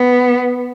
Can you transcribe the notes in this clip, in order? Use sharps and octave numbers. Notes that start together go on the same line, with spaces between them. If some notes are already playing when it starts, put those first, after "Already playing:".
Already playing: B3